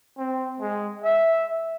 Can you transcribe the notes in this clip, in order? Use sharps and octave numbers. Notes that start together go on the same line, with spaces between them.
C4
G#3
E5